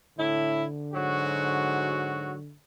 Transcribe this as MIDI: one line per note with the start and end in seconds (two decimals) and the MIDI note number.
0.18 0.64 45
0.18 2.55 50
0.18 0.64 64
0.94 2.35 44
0.94 2.35 54
0.94 2.35 66